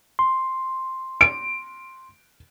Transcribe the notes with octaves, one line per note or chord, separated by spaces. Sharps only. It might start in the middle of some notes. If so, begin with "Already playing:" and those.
C6
D7